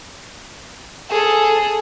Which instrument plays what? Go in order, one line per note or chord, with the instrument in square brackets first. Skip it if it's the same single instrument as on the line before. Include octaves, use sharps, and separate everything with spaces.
[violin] G#4 A4